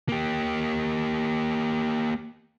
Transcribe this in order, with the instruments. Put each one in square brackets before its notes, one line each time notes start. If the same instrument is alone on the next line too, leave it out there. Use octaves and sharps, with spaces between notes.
[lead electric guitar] A#3 G4